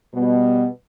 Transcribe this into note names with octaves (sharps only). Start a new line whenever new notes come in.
B2 G3 B3